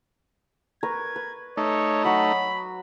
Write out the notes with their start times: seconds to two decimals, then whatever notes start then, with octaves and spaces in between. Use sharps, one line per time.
0.83 A#4 B4 C#6 G#6
1.16 B4
1.57 A3 D#4 C#5
2.04 F#3 F#4 B5